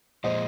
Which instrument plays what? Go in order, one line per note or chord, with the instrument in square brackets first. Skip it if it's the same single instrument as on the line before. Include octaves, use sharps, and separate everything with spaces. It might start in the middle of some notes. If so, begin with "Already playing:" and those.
[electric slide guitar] A#2 F3 G#3 [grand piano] C5 D#5